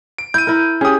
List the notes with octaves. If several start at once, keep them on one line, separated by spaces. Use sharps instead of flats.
D7
E4 G6 D#7
E4 A#4
C#4 G4 G#4 D#6